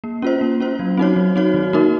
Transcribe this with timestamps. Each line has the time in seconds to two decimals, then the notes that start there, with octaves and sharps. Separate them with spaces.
0.04 A#3
0.22 C#4 F4 C5
0.41 A#3
0.60 C#4 F4 C5
0.79 F#3
0.97 C4 D#4 F#4 C#5
1.16 F#3
1.36 C4 D#4 F#4 C#5
1.54 D#3
1.73 A#3 D#4 F#4 A#4